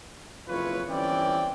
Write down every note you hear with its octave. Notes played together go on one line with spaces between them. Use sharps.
F#1 F2 E4 F4 B4 C#5
G1 E3 C4 C#4 D5 G5